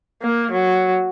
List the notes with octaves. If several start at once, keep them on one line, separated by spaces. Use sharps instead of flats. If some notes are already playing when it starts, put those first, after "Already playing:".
A#3
F#3